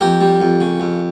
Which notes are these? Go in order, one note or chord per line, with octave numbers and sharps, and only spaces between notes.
F2 G4 A#4
G3
F2
C#3
F2